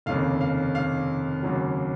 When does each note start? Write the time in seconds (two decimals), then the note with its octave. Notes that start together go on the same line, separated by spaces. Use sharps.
0.06 F1 D#2 C#3 F5
0.41 F5
0.75 F5
1.43 D#2 C#3 F#3